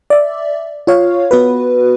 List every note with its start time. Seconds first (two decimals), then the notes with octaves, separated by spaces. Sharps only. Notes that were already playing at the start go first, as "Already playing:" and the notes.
0.10 D5 E5
0.87 F4 C#5 F5
1.31 B3 F#4 B4